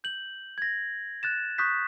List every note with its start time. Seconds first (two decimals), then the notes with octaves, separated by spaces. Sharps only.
0.04 G6 F#7
0.58 G#6 A#6
1.23 F#6 A6 E7
1.58 C#6 D#6 F#6 G6 B6